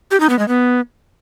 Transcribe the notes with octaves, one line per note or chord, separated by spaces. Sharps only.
G4
D#4
B3
G#3
B3